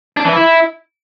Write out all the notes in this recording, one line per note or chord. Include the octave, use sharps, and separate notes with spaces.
D4
E3
E4